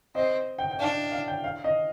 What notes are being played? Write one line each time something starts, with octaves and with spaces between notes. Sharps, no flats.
C4 D#5
G5
G5
D4 F5
F5
G5
F5
D#5